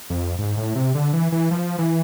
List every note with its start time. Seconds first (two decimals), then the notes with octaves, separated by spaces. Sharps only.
0.10 F2
0.39 G#2
0.57 A2
0.75 C3
0.95 D3
1.13 E3
1.32 E3
1.51 F3
1.78 E3